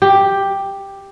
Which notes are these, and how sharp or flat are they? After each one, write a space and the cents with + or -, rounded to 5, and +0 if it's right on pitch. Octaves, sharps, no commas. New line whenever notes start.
G4 +5